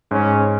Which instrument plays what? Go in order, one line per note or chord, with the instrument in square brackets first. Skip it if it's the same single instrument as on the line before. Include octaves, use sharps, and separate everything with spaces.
[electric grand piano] G#2 [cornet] C#4